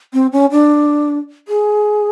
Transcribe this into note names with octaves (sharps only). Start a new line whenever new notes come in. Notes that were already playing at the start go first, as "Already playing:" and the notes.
C4
C#4
D4
G#4